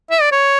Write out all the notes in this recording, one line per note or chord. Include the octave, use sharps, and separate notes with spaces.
E5
D5
C#5